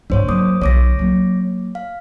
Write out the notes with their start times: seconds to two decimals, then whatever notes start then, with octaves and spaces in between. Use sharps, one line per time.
0.10 G1 G#2 D4 C5 C#5
0.28 F#3 A#3 D6 D#6
0.61 B1 D#3 C#5 D6 A#6
0.99 F#3 A#3
1.75 F5